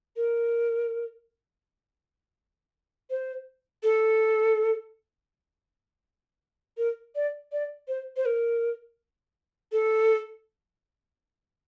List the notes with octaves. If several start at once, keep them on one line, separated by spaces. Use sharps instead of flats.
A#4
C5
A4
A#4
D5
D5
C5
C5
A#4
A4